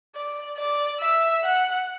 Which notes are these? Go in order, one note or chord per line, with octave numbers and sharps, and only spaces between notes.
D5
D5
E5
F#5